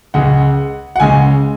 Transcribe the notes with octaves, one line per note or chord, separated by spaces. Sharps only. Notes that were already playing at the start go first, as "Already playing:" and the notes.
C#2 C#3 G#3 F#5
F#5
C#2 C#3 G#3 G#5